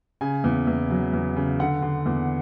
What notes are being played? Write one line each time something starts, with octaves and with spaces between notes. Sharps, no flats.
C#3 G#5
E2
E2
F#3
E2
C#3
D3 F#5
D3
E2